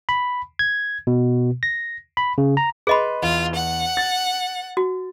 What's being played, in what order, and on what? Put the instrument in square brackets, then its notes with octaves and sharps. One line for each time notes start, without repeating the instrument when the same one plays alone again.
[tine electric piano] B5
G#6
B2
A#6
B5
C#3
A#5
[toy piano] G#4 D#5 B5 [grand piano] B4 C6
[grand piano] E2 [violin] F4
[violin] F#5
[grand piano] A6
[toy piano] F#4